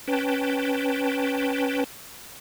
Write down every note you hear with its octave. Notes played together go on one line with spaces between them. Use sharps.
C#4 B4 G5 A5